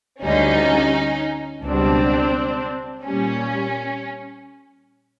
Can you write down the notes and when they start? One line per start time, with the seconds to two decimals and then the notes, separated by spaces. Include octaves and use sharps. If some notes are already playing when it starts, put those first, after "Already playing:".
0.24 D2 D3 G3 C#4 D#4
1.64 C#2 B2 G3 C4 D4
3.05 A#2 G3 C#4